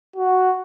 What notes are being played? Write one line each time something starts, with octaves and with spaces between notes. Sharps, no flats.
F#4